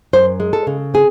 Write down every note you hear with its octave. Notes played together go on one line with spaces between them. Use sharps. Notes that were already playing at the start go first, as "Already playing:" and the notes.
F#2 C5
G#3
A4
C#3
C4 G#4